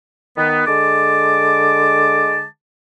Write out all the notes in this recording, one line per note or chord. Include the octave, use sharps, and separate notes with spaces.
D#3 B3
D3 G#3 A5 D6